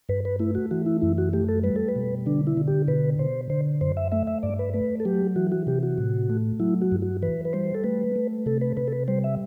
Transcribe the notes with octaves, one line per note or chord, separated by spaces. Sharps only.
G2 B4
B4
A3 E4
F#4
E3 F#4
E4
F#2 E4
F#4
A3 G4
A4
G3 B4
A4
B4
B2
D3 D4
E4
D3
G4
B2 B4
B2 C5
D3 C5
F#2 C5
E5
A3 E5
E5
G2 D5
B4
A3 B4
A4
F#3 G4
E3 F#4
F#4
C3 G4
F#4
A2
A3
F#3 E4
F#4
G2
F#4
E3 B4
B4
G3 C5
A4
A3 B4
A3
C3 A4
B4
C3 B4
A4
B4
G3 C5
E5